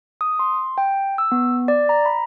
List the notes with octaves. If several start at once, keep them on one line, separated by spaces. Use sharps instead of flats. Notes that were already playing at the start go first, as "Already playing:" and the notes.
D#6
C6
G5
E6
B3
D5
A#5
B5